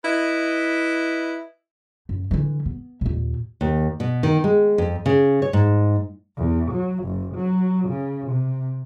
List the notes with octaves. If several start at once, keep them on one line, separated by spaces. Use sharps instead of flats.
E4 B4 D#5
F#2
D3 E3
B3
D#2 A#2
D#2
B2
D#3
G#3
F2
C#3
C#5
G#2
E2
F#3
F#1
F#3
C#3
C3